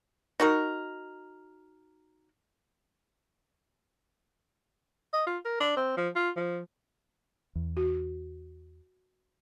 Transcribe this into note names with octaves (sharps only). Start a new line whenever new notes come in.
D#4 F#4 A#4
D#5
F4
A#4
D4
C4
F3
F4
F3
E2
F#4